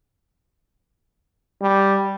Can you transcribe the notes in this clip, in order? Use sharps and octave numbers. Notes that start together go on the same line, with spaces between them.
G3